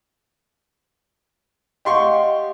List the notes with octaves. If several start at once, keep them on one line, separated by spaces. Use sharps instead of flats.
G4 D#5 F5 F#5 C6 C#6